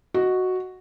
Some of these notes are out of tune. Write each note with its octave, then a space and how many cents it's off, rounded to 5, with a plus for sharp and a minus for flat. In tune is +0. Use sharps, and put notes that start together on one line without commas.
F#4 +0 D#5 +0